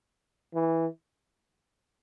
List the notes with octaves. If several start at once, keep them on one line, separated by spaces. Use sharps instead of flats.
E3